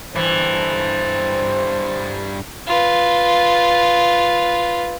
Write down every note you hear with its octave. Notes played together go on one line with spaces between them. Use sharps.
G2 E3 A4 C5
F4 B4